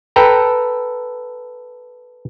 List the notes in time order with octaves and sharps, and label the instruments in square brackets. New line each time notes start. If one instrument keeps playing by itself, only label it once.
[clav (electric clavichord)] A4 B4 G5 A#5